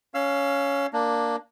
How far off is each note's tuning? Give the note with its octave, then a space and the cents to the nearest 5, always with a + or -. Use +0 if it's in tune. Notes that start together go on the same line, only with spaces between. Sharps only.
C#4 +10 F5 +0 E6 +40
A#3 +0 D4 +0